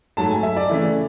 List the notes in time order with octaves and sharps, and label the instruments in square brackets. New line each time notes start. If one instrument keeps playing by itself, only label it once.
[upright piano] G#2 F#3 A3 A5
G#5
E5
D5
C#3 E3 A3 E4